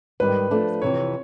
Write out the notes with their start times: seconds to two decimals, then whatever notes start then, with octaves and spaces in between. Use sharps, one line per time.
0.20 G#2 D#3 G3 B4
0.51 F3 A3 D4
0.82 F2 C3 E3 C#5